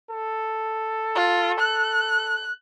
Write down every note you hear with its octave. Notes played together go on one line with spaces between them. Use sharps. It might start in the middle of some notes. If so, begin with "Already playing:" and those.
A4
F4
F#6